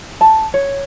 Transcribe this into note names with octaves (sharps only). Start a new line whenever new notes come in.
A5
C#5